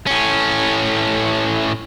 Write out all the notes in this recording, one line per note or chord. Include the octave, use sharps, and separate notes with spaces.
A2 C#4